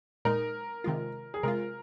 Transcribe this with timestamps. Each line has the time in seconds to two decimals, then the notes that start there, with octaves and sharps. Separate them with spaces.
0.25 A#2 G#3 D#4 A#4
0.84 C3 D#3 G#3 F4
1.34 G#4
1.43 C3 G#3 F4 A#4